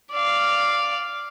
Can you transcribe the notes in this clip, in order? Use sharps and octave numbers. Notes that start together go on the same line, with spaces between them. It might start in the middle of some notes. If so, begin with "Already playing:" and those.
D5 F5